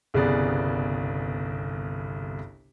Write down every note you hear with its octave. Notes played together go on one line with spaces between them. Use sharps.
G1 C2 C#3 B3 G#4 D5